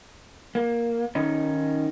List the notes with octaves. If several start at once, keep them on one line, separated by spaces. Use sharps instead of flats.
A#3
D#3 C#4 D#4